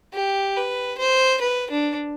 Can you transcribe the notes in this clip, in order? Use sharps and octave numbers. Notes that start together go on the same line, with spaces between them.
G4
B4
C5
B4
D4